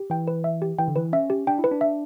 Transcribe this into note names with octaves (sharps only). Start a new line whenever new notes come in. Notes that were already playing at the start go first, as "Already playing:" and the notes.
Already playing: G4
E3 G5
B4
E5
G4
E3 G5
D3
E3 B4
C#4 E5
G4
D4 G5
E4
B4
D4
E5